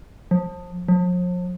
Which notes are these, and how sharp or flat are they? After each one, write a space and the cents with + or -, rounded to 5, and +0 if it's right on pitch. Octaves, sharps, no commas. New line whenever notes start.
F3 +30
F3 +40